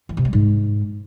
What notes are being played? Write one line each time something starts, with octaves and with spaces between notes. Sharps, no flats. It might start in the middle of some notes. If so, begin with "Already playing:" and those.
E3
C3
G3
G#2